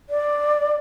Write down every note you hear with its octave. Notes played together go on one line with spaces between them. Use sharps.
D5